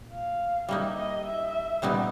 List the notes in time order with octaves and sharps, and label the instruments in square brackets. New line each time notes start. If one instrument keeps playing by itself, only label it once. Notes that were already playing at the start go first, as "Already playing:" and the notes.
Already playing: [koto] A#2
[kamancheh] F5
[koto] G3 A#3 D#4 [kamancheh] E5
[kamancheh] D#5
E5
[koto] A#2 G3 B3 D#4